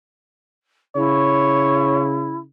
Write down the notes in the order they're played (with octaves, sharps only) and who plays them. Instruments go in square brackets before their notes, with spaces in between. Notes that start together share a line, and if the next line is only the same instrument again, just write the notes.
[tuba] C#3 [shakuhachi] E4 [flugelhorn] C#5